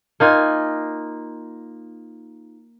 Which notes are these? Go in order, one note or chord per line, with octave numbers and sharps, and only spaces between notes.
A#3 D#4 F4 G#5